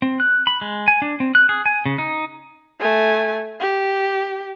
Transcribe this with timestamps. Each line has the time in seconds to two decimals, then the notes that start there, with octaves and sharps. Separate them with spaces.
0.02 C4
0.20 F#6
0.47 B5
0.61 G#3
0.88 G#5
1.02 D4
1.20 C4
1.35 F#6
1.49 G#4
1.66 G#5
1.86 C#3
1.98 D#4
2.80 A3 G#5
3.60 G4